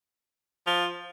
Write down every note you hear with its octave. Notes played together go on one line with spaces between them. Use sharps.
F3